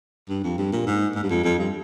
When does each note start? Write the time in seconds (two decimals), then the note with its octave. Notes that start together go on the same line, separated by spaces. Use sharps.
0.29 G2
0.44 F2
0.58 G2
0.72 A#2
0.86 G#2
1.15 G#2
1.23 G2
1.30 F2
1.44 F2
1.58 G2